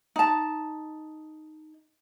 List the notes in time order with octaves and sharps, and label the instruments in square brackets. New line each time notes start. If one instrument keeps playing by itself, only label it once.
[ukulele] D#4 A5